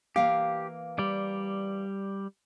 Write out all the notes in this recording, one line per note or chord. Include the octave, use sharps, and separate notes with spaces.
E3 A#3 G4 F5
G3 D5